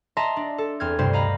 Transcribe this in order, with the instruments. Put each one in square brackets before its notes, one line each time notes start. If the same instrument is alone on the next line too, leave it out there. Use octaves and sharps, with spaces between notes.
[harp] D#5 E5 A5 A#5 C6
D4
A4
E2 C4 F6 G#6
D2 G2 C3 G3 C5
D#5 F5 A#5 B5